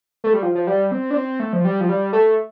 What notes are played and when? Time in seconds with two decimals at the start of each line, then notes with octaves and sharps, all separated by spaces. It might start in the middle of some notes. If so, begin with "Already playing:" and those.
0.24 A3
0.34 G3
0.43 F3
0.55 F3
0.67 G3
0.92 C4
1.11 D4
1.15 C4
1.40 A3
1.53 F3
1.65 G3
1.81 F3
1.89 G3
2.13 A3